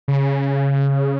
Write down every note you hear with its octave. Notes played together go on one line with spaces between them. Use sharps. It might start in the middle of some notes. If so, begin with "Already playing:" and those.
C#3